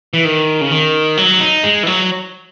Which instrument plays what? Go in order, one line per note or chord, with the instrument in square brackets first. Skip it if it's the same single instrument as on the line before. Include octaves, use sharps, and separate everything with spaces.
[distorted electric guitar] E3
D#3
C#3
D#3
F#3
D#4
G#3
E3
F#3